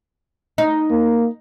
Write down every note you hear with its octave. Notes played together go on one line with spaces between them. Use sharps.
D#4
A#3